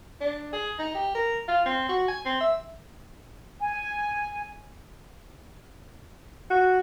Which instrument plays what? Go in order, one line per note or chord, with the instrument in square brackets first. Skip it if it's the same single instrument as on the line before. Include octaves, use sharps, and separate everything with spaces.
[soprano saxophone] D4
G#4
D#4
G4
A#4
F4
C4
F#4
G#5
C4
E5
[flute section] G#5
[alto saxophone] F#4